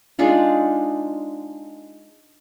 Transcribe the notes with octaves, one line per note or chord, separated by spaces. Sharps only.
G#3 D4 D#4 F4